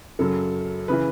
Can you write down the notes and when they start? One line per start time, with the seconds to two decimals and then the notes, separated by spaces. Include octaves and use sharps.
0.19 F#2 C#3 F#3 A4
0.88 C#3 E3 B4